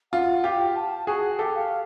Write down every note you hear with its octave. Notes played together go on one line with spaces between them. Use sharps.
F4 F#5
F4 G4 G5
A5
F#4 G#4 G#5
F#5
G5
G4 A4
F5